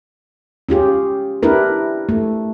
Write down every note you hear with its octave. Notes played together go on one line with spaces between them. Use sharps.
C#4 F4 G4 G#4
D4 E4 G4 A#4 B4
A3